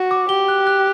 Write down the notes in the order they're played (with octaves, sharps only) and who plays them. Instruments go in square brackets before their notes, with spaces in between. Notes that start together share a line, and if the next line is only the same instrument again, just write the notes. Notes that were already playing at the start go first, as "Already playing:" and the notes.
Already playing: [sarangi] F#4
[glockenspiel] D6
[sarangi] G4 [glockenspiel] G7
[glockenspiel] F#6
F#6